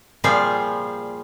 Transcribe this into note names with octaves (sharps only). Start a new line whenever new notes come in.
A#2 F3 G3 G#4 F5